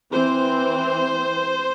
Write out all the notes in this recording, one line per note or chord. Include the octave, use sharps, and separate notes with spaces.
E3 C4 C5